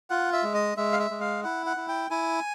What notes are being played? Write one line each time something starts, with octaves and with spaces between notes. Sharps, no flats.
F4 F#5
E5
G#3
D#5
G#3 E5
F5
E5
G#3
F5
E4 F#5
F#5
E4
G5
E4 G#5